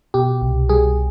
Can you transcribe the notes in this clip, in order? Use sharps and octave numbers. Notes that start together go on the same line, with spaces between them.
B2 G4
C2
G3 G#4